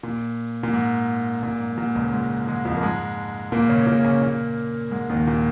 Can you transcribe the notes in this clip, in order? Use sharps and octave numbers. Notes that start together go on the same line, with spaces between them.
A#2
A#2
G#2
A#2
G#2
G#2
A#2
C#2 C#3
G#2 G#3
G#2 G#3
F2 F3
A#3
G#2 G#3
A#2 A#3
C#3 C#4
A#2 A#3
C#3 C#4
A#2 A#3
G#2 G#3
D#2 D#3
A#2